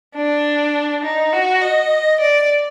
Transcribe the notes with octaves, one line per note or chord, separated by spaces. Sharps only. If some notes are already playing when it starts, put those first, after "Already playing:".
D4
D#4
F#4
D#5
D5